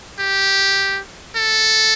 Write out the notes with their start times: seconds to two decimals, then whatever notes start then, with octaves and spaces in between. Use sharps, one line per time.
0.19 G4
1.36 A4